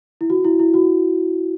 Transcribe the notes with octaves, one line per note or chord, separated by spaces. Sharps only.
E4
F#4
E4
E4
F#4